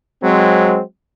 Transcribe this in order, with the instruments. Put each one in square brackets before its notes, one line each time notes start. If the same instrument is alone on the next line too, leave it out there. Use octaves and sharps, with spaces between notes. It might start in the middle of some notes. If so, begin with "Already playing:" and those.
[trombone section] F#3 G#3 C4